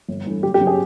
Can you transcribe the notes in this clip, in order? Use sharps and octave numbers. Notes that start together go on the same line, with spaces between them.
G1
G2 E3 A3
F#1 G4
G4
C#3 F#3
G#4